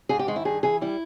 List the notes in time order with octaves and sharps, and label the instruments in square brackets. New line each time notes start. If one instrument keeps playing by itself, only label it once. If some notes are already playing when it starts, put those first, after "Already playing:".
[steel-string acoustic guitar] G#2 G#4
G4
D#3 G#3
E4
G2 G#4
E3 G#4
G3 E4